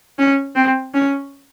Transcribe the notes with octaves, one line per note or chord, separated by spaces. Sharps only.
C#4
C4
C#4